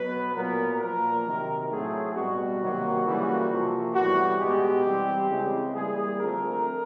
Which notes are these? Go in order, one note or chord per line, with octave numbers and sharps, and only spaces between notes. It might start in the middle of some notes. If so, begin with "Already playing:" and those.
Already playing: B2 F#3 B3 B4
A#2 F#3 B3 A#4
A#2 F3 A#3 A#4
C3 D#3 F#3
A2 F#3 A3 C4 G#4
B2 G3 B3 F#4
C3 D#3 F#3 A#3
C#3 E3 G3 A#3
C3 F3 A#3
A2 E3 G3 B3 F#4
B2 G#3 B3 G4
E3 G3 C4
C#3 E3 G#3 C4
E3 G3 A#3 G#4
D3 F3 A3 C4 A#4